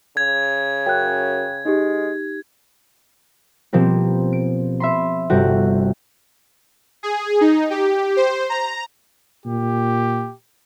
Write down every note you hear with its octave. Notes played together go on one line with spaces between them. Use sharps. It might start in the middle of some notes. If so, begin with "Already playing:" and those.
C#3 G#6
F#2 G5 F#6
G#3 D#4 G4
B2 F3 A#3 C4 G4
D7
E5 B5 C6
G1 C3 F#4 G4 A4
G#4
D#4
G4
C5
A#5
A#2 G4